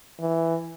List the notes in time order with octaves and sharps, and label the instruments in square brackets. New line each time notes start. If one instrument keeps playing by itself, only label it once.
[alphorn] E3